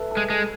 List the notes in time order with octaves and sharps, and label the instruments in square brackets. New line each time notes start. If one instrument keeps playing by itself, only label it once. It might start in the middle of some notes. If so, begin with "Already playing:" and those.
Already playing: [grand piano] A4 B4 E5
A4
[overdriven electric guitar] G#3
[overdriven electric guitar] G#3 [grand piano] A4